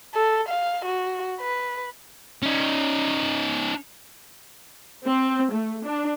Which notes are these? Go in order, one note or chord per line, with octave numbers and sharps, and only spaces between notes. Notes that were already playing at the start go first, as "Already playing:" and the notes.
A4
F5
F#4
B4
C#4 D#4
C4
A3
D4